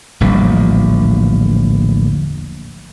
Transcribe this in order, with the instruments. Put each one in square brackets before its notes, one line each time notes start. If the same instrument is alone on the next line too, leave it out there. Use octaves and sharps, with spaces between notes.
[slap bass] D1 A#1 E2 G3